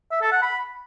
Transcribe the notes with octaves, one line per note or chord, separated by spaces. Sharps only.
E5
A4
F#5
B5